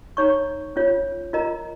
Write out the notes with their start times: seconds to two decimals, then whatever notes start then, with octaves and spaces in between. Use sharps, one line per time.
0.17 D#4 C#5 A#5 C#6
0.76 C#4 F4 C#5
1.33 F4 A#4 D#5 A#5